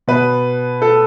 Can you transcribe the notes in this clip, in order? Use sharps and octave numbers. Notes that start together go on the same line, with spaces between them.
B2 B4
A4